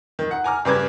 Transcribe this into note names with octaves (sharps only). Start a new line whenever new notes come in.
D#3
F#5
G#5 A#5 D6 F6
G2 C#3 B4 D6 G#6